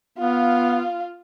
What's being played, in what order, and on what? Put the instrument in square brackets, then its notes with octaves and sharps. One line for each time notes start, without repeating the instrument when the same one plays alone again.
[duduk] B3 [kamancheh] F4 F5